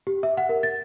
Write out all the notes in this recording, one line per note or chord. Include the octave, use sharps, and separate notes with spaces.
G4
E5
F#5
A#4
A6